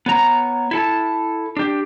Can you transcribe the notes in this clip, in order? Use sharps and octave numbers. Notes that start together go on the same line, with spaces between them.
B3 C#5 A#5
E4 A4 A5
D4 G4